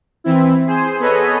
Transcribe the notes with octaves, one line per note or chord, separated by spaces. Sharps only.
E3 C4 E4
G#4 C5
B3 G#4 A4 B4 C#5 D#5